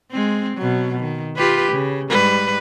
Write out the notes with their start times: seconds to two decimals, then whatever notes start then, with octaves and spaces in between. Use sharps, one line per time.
0.11 G#3 C4
0.57 B2 F#3
1.00 D#3
1.36 F4 G4 B4
1.72 C#3
2.10 G#2 G3 B4